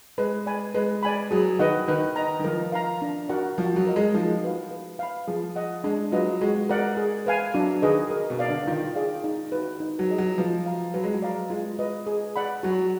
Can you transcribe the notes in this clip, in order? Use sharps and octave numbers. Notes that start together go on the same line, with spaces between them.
G#3 B4
D5 G#5 B5
G#3 B4
D5 G#5 B5
F#3 G#4
D#3 B4 D#5 F#5
D#3 B4
D#5 A#5
D#3
F3 A#4
F5 A#5
D4
F#4 A#4 D5 F#5
F3 F#4
F#3
A#4 D#5
G#3
F3 D#4
F#4 B4 F5
B4
F5 B5
F3 G#4
D#5 F#5
G#3 D4
F#3 F4 B4 D#5
G#3 F#4
A#4 D5 F#5
G#4
B4 F5 G#5
F#3 D4
D#3 G#4 B4 D#5
A#4
B2
D5 F5
D3
D#3 F4
G#4 D5 F5
D#4
F#4 B4
D#4
F#3
G#4 D#5
F#3
F3 B4
F5 A#5
F#3 B4
G#3
F#3
D5 F5 A#5
G#3 F4
B4 D#5
G#4
D5 F#5 B5
F#3 F#4